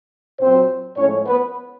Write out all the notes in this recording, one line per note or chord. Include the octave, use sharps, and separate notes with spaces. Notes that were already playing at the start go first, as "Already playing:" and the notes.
A#2 F#3 C4 C5
A2 F3 G#3 C#4 C#5
B3 B4